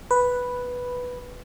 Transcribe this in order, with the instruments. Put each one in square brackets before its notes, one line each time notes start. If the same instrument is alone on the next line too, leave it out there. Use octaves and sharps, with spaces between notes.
[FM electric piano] B4